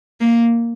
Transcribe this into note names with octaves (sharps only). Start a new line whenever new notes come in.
A#3